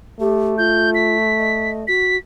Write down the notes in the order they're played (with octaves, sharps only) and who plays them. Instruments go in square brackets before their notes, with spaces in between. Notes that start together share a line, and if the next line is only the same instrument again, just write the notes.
[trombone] A3 [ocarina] G4
[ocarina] F4 [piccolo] G6
[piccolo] B6
[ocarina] D#5
[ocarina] F#4 [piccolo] B6